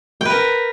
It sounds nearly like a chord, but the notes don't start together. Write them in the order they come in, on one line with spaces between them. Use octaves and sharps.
G5 B4 A#4